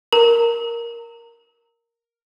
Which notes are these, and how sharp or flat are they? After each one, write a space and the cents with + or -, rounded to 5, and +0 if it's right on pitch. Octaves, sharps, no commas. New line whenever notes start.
A#4 +0 A#5 -30